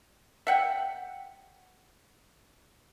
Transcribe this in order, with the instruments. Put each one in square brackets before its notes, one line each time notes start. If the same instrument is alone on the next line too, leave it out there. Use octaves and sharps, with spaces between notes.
[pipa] E5 F#5 G5